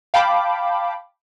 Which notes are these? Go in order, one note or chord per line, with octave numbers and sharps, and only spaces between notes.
F5 G5 A5 B5 D6